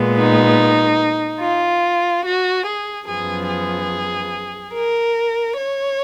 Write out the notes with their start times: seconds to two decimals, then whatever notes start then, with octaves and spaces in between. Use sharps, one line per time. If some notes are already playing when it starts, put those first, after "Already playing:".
Already playing: A#2 G#3 B3
0.15 D#4
1.40 F4
2.23 F#4
2.65 G#4
3.06 F#2 F3 B3 G#4
3.48 G#4
4.73 A#4
5.56 C#5